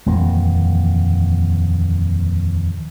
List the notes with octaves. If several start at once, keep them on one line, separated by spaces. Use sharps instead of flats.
D#1 F2 E3 A#3